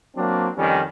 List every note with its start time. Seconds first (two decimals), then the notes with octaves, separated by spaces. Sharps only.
0.16 F#3 A#3 C4 D4
0.56 F2 D#3 G3 C#4